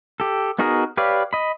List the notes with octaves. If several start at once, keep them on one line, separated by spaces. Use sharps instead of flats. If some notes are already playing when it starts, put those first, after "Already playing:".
G4 A4
B3 D#4 F#4 G#4 A#4
G4 B4 C#5 D5 F5
D#5 B5